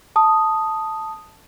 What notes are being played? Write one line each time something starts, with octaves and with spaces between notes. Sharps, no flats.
A5 D#6